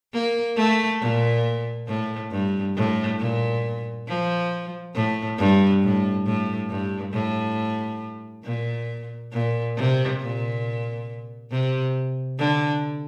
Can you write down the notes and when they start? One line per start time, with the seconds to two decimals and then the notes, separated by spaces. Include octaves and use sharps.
0.13 A#3
0.56 A3
1.01 A#2
1.88 A2
2.31 G2
2.76 A2
3.20 A#2
4.07 F3
4.95 A2
5.38 G2
5.82 A2
6.26 A2
6.69 G2
7.13 A2
8.44 A#2
9.32 A#2
9.76 C3
10.20 A#2
11.51 C3
12.39 D3